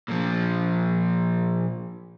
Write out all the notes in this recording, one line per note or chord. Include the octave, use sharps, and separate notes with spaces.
A#2 F3